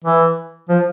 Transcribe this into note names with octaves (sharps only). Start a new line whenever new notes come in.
E3
F3